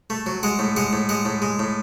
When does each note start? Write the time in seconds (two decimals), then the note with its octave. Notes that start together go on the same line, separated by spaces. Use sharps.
0.10 A3
0.26 F#3
0.43 G#3 F#5
0.59 A2
0.76 G#3 F#5
0.93 A2
1.09 G#3 F#5
1.25 A2
1.42 G#3
1.59 A2